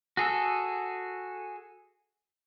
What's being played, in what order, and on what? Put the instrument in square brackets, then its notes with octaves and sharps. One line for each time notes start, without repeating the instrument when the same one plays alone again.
[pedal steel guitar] F#4 G#4 A4 E6